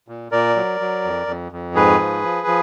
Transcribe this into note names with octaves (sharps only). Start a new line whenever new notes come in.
A#2
A#2 A#4 D5
F#3
F#3
F2
F2
F2
G#2 G#4 B4
F3
F3
F3